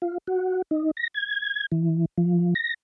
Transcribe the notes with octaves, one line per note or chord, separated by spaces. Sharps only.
F4
F#4
D#4
A#6
G#6
E3
F3
A#6